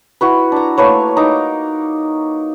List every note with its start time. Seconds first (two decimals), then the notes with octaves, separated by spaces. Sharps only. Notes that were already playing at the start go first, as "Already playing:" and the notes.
0.21 E4 F#4 B4
0.52 D4 A#5
0.77 A3 A#3 B4 C#5
1.16 D#4 A#4 D6